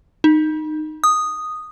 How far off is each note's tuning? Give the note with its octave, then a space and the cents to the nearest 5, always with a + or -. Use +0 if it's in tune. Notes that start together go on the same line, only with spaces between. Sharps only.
D#4 -15
D#6 -5